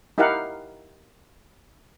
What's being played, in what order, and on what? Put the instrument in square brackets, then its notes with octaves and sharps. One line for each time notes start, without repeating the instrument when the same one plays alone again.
[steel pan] D#4 E4 G4 A#4 F5 F#5